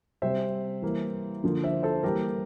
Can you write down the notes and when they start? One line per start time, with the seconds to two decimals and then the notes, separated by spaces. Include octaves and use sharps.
0.22 C3 G3 C4 C5 E5
0.82 E3 G3 A#3
1.44 D3 F3 A#3
1.64 C5 E5
1.83 A4 C5
2.03 E3 G3 A#3 G4 A#4